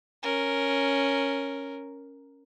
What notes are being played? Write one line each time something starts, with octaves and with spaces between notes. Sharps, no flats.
C#4 A#4